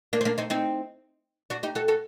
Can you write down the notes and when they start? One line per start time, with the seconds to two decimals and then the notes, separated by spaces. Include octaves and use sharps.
0.13 A#3 D4
0.21 C4
0.25 A#3 D4
0.38 C4 D#4
0.50 C4 D#4
1.50 D4 F#4
1.63 D#4 G4
1.75 F#4 A4
1.88 F#4 A4